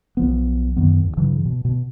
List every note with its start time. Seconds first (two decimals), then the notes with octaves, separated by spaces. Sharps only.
0.17 B1 F3 B3
0.76 F#2 D#3 B3
1.04 E2
1.17 G2 C#3 E3 F#3
1.45 B2
1.65 B2